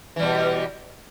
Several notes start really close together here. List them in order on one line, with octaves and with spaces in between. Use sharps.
E3 G3 B2